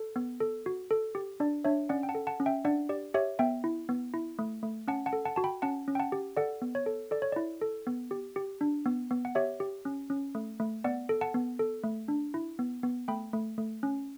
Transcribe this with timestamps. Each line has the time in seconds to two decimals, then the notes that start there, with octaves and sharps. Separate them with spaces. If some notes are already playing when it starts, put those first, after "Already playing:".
Already playing: A4
0.16 B3
0.40 A4
0.66 F#4
0.91 A4
1.15 G4
1.40 D4 D5
1.64 D4 C#5 E5
1.89 C#4 D5 F#5
2.03 G5
2.09 F#5 A5
2.15 A4
2.27 F#5 A5
2.40 C#4
2.46 E5 G5
2.65 D4 D5 F#5
2.89 G4 D5
3.14 G4 C#5 E5
3.39 B3 E5 G5
3.64 E4
3.89 B3
4.14 E4
4.39 A3
4.63 A3
4.88 C#4 F#5 A5
5.06 F#5 A5
5.13 A4
5.25 F#5 A5
5.36 F#4 A5
5.44 G5 B5
5.62 C#4 F#5 A5
5.88 C#4
5.95 G5
6.00 F#5 A5
6.12 G4
6.37 A4 D5 F#5
6.62 B3
6.75 C#5
6.86 A4
7.11 A4 D5
7.22 C#5
7.32 E4 D5
7.61 A4
7.87 B3
8.11 G4
8.36 G4
8.61 D4
8.86 B3
9.11 B3
9.25 F#5
9.35 G4 C#5 E5
9.60 G4
9.85 C#4
10.10 C#4
10.35 A3
10.60 A3
10.84 B3 D5 F#5
11.09 A4
11.21 F#5 A5
11.34 B3
11.59 A4
11.84 A3
12.08 D4
12.34 E4
12.59 B3
12.83 B3
13.08 A3 G5 B5
13.33 A3
13.58 A3
13.83 C#4